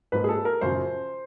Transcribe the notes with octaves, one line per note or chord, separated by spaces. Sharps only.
G#2 F3 A#3 B4
G#4
A4
A#4
F#2 C#3 F3 C5